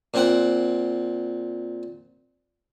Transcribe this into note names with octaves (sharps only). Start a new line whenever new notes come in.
A#2 C4 F#5